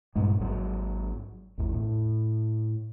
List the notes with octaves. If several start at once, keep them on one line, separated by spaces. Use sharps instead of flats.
G2 A#2 G#3
G#1 G#2 C#3 F#3
G#1 E2
A2